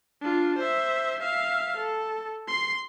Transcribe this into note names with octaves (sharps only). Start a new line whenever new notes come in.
D4 F4
C5 E5
E5 F5
A4
C6 C7